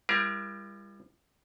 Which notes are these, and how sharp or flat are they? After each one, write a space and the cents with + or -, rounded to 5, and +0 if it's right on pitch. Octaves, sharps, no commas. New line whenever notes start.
G3 +35 F4 -45 A#4 +25